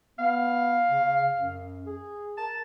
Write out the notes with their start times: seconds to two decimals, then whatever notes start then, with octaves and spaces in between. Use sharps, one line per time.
0.19 B3 F5
0.90 C#3
1.35 F#2
1.86 G#4
2.38 A#4 A5